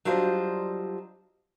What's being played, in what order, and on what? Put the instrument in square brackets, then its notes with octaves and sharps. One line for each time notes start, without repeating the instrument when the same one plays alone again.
[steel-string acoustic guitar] F#3 G3 D4 F4 C5 D#5